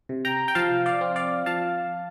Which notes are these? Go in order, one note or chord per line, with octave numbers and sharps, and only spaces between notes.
C3
G5 A#5
G5
F3 F5 A5
D5 F5
C4
D5 F5
F3 F5 A5